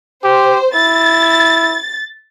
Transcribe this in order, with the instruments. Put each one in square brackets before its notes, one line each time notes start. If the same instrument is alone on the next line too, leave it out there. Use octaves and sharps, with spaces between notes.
[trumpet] G4 [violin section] C5
[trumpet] E4 [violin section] A6